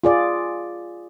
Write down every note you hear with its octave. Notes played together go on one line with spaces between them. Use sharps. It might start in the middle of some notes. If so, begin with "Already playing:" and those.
F4 G#4 D5